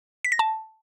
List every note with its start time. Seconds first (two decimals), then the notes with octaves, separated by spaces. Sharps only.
0.25 B6
0.32 A#6
0.39 A5